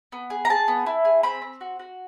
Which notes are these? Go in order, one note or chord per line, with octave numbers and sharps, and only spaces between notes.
B3
G#4
A#5
G#4 A5
B3
E4
G#4
C4 B5
C4
F#4
F#4